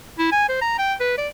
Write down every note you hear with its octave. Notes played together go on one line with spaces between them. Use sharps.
E4
G#5
C5
A#5
G5
B4
D5